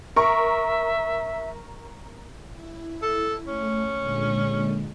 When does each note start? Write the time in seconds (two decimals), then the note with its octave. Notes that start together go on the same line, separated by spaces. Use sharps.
0.16 A#4 E5 C#6
2.51 E4
3.02 A4
3.47 A3 C#4
4.01 A#2 D3 G#3